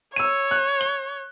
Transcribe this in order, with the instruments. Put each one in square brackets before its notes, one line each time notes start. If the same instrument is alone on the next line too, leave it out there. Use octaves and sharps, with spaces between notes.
[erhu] C#5 [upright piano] E6 D#7
[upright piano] F#6
G7